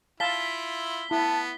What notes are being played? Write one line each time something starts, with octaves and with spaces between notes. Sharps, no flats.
E4 F4 F5 A5 B6 G7
B3 E4 A5